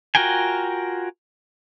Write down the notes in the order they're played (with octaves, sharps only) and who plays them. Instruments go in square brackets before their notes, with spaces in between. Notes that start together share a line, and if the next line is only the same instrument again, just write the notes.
[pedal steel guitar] F4 F#4 A#4 G5 G#5